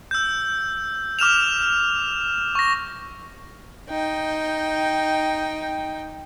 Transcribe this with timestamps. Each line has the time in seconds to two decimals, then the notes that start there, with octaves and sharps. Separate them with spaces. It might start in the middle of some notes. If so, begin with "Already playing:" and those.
0.11 E6 G6
1.19 D6 F6 E7 F7
2.55 C#6 A#6
3.89 D#4 G5